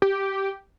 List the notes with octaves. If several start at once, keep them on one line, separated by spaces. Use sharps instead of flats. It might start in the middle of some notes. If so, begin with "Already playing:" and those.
G4